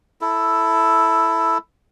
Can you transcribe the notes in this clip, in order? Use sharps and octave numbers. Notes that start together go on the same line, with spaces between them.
E4 A4